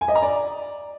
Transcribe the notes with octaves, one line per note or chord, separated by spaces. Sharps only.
G#5
D#5
A#5
D5